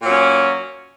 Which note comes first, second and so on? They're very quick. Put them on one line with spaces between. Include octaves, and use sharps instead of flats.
A#2 F#3 C#4